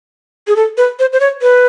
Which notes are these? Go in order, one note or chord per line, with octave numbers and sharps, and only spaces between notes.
G#4
A4
B4
C5
C5
C#5
B4